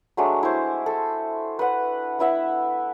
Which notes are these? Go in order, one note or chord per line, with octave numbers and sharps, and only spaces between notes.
F#3 G#3 A3 D4
E4 C5
A4
B4 F#5
B3 E4 E5 F#5